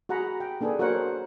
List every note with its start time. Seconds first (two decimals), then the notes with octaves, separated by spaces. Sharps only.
0.09 F#4 G#4 F#5 A#5 B5
0.40 G5
0.61 A#3 D4 G#4 A4 B4
0.79 F#4 A#4 C5 C#5 F#5